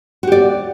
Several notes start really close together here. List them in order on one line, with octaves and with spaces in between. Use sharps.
F#4 G4 D5